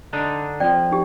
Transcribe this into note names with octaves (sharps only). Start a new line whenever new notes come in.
D3 D4 D#4
F2 F3 D5 G5
D#4 G4